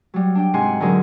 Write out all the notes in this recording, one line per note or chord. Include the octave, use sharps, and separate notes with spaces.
F#3 G3
D4 G5
G#2 C3 F#5 G#5 C6
D3 F#3 G#4 A#4